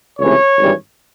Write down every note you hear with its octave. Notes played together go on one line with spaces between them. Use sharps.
C#2 C3 E3 A3 C#5
G#1 G2 E3 G3